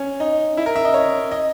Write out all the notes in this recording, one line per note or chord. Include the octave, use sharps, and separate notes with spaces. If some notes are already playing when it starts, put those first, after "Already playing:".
Already playing: C#4
D#4
E4
A#4
E5
D#5
C#5
D#5